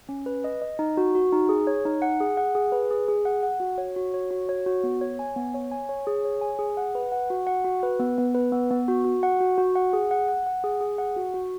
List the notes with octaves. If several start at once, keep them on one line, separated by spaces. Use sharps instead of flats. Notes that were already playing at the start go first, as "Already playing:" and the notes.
C#4
B4
D#5
D#5
D#4
F#4
F#4
D#4
G#4
C#5
D#4
F#5
G#4
F#5
G#4
B4
G#4
G#4
F#5
F#5
F#4
C#5
F#4
C#5
F#4
C#5
F#4
B3
C#5
G#5
B3
C#5
G#5
C#5
G#4
C#5
G#5
G#4
F#5
B4
F#5
F#4
F#5
F#4
B4
B3
B3
B4
B3
B3
F#4
F#4
F#5
F#4
F#4
F#5
G#4
F#5
F#5
F#5
G#4
G#4
F#5
F#4
F#4